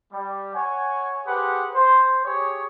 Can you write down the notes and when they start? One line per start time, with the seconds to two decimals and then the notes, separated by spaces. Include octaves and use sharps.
0.12 G3
0.54 C#5 F#5 G#5
1.26 G4 G#4 B4 C5 F#5
1.74 C5
2.25 G4 G#4 C#5